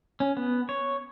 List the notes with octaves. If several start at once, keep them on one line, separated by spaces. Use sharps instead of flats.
C#4
B3
C#5